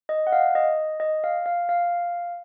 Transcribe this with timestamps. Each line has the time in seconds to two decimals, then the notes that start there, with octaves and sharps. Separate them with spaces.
0.09 D#5
0.27 F#5
0.32 F5
0.55 D#5
1.00 D#5
1.24 F5
1.46 F5
1.69 F5